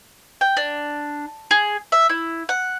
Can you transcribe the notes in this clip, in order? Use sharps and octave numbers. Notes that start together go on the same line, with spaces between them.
G5
D4
G#4
E5
E4
F#5